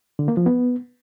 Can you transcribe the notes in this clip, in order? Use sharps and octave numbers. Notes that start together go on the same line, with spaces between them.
D3
A#3
F3
B3